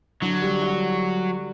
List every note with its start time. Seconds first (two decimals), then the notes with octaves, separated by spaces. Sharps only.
0.22 D3 F#3
0.42 G3
0.62 F#4